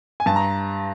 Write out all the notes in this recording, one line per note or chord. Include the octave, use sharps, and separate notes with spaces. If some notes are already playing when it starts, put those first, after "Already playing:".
G#5
G2 A5
A#5